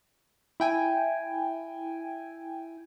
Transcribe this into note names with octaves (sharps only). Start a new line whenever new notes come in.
E4 G5 G#5